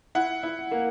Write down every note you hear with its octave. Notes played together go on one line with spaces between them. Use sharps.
E4 F#5
E4
A#3